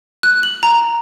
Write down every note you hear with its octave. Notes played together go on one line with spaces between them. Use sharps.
F#6
F#7
A#5